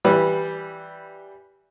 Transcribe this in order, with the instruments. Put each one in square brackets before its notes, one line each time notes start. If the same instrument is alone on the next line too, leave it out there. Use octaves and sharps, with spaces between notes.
[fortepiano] E3 G3 B4